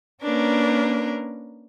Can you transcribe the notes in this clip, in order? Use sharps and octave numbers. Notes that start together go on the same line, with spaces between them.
A#3 C#4 D4 A#4 B4